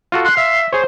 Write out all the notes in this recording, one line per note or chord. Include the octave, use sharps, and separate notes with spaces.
F4 F#4 A4
C6 F#6
E5 F5
G#4 C5 C#5